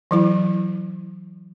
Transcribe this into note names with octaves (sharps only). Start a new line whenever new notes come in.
E3 F#3 E4